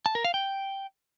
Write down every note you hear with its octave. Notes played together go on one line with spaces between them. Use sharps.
A5
A#4
F5
G5